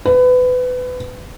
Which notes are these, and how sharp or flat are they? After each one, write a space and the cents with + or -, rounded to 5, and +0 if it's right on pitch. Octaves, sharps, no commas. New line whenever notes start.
B4 +25